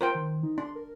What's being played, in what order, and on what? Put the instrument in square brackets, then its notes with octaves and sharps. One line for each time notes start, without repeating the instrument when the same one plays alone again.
[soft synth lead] F4 [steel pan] A#4 C5 G5
[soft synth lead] D#3
D#4
[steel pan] D4 [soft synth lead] C6
[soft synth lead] A#4